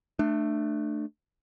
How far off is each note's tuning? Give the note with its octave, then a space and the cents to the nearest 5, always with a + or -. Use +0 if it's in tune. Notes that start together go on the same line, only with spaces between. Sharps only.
A3 +0 D4 +25